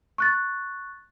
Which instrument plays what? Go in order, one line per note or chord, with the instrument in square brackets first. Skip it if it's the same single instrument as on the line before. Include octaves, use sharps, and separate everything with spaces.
[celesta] C#6 F#6 A6